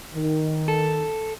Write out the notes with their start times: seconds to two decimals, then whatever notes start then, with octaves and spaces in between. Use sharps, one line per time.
0.15 D#3
0.68 A4